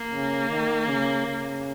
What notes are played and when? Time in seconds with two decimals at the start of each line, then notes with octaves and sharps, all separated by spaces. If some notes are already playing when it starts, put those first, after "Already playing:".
Already playing: A#3
0.11 C#3
0.49 D#3
0.87 C#3
1.26 C#3